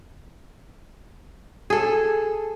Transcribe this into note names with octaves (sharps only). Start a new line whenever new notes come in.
G#4 A4